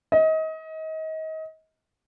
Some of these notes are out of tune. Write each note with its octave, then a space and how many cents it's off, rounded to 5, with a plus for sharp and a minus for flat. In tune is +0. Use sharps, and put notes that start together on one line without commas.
D#5 +30